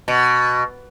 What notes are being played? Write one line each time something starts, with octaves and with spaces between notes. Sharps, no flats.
B2